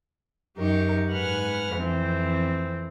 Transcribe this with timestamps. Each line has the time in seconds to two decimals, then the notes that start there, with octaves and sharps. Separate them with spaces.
0.57 F#2 D#4 G4 A#4 C#6
1.12 G#2 B4 F#5 G#5 F6
1.72 F2 E3 C4